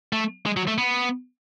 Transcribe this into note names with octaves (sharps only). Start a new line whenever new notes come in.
A3
G#3
F#3
A3
B3